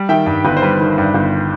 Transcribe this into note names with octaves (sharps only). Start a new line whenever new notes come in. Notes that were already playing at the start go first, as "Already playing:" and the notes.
Already playing: G3
D#3 E5 G5
G2
G1 B4
C5
G3 B4
D#3
G2
G1